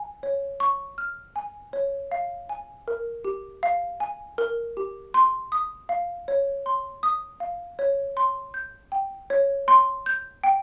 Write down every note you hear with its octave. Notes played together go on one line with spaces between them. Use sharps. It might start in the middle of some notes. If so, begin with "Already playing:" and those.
Already playing: G#5
C#5
C#6
F6
G#5
C#5
F5
G#5
A#4
G4
F5
G#5
A#4
G4
C6
D#6
F5
C#5
C6
D#6
F5
C#5
C6
G6
G5
C#5
C6
G6
G5